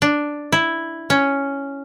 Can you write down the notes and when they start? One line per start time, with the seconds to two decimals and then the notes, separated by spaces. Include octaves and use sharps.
0.02 D4
0.52 E4
1.10 C#4